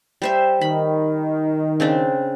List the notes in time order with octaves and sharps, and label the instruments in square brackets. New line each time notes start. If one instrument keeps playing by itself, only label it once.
[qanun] G3 C5 E5
[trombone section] D#3 [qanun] B5
[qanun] C#3 C4 D4